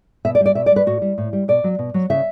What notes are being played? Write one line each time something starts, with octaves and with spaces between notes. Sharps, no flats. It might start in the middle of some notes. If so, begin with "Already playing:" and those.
B2 E5
D5
G3
D5
B2 E5
D5
G3
B4
A2 F#4
G3
A2
G3
B2 D5
F#3
B2
F#3
C#3 E5